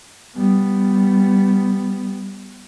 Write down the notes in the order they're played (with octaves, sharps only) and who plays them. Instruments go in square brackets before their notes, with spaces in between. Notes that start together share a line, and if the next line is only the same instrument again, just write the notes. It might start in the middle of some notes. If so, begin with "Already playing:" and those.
[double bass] G3 B3